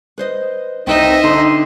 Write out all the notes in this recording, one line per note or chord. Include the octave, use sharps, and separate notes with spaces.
B4 C5 D#5
C2 C4 D#4 B4 C5 D#5 E5
D3 D#4 C6